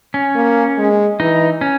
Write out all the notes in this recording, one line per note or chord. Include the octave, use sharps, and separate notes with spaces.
C#4
A#3
G#3
E3 D#4
C#4